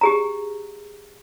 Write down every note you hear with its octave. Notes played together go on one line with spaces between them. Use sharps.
G4 G#4 A#5